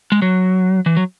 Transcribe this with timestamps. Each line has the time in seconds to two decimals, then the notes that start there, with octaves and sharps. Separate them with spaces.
0.12 G#3
0.22 F#3
0.86 E3
0.97 F#3